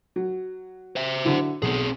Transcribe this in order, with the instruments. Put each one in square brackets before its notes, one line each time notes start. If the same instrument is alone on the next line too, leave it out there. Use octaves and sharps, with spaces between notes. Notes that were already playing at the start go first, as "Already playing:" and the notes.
[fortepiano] F#3
[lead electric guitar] C5 E5
[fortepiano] D3 F#3 E4
[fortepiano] B1 [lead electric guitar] C4 G#4